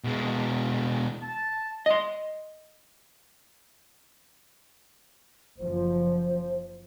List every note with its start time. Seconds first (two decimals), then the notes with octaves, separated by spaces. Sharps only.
0.04 B2 G#3
1.22 A5
1.86 D#5 C6
5.59 F#1 F3 C5